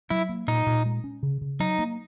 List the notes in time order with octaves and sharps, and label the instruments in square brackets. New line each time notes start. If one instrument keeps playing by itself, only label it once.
[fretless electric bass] F#3 [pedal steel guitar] E4
[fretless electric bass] A#3
[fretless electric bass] A#2 [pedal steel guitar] D#4
[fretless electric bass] A#2
G#3
C#4
C#3
C#3
[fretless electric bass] F#3 [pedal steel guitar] D#4
[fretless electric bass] A#3